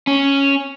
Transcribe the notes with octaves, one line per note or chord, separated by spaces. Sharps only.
C#4